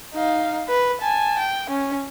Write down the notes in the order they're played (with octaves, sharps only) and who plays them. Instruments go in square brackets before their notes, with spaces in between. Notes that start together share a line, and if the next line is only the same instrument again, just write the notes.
[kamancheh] D#4 F5
B4
G#5 A5
G5
C#4